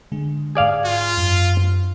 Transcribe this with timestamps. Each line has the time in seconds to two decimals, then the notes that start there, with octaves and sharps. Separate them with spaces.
0.12 D3 G#3 G#4
0.55 G#2 G#4 D5 F5 G#6
0.85 F4
1.18 F#2